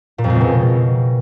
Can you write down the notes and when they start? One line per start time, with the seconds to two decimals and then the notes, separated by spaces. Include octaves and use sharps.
0.18 A#2
0.24 F2
0.30 G#3
0.35 C#3
0.41 B2